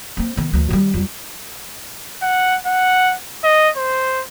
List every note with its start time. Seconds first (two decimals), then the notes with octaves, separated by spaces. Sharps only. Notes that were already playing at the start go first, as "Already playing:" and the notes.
0.17 A#3 C4
0.37 D#3 B3
0.53 D2 E3
0.70 D#3 G3
0.94 F2 G3
2.22 F#5
2.66 F#5
3.44 D#5
3.77 C5